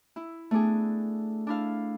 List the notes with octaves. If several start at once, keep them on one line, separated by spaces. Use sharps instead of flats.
E4
A3 B3 D4 G#4
D4 E4 F5